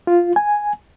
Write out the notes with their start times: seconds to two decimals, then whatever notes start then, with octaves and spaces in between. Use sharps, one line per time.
0.07 F4
0.36 G#5